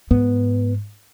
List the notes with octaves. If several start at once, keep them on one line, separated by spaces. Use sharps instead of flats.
G#2 B3